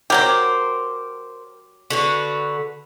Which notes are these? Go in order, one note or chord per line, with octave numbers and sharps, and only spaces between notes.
F#3 G4 A#4 C5
D3 F#4 B4